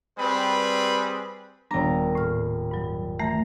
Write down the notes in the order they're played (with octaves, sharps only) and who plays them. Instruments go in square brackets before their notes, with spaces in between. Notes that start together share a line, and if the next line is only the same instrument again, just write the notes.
[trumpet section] G3 C4 G#4 B4 B5
[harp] D#1 A#5 [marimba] G3 B3 D4
[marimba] A2 F6
G2 F#3
[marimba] E3 A3 [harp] A#5